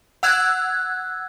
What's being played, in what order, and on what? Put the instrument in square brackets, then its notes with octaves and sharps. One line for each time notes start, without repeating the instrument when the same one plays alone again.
[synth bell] F#5 E6 F#6 G#6